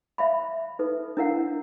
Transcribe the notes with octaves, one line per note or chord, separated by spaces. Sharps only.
E5 F5 B5
D#4 A4 B4
D4 E4 A#4 F5 F#5